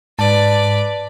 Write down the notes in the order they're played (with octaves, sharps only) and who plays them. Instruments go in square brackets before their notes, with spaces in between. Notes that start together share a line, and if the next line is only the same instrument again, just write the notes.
[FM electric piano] G#2 A5 [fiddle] B4 D5